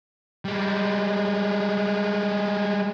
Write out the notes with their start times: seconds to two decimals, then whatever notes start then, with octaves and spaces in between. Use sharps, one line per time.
0.45 G3 G#3